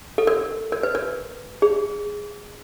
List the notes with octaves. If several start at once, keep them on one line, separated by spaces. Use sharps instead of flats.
A4
A#4
A#4
B4
A#4
G#4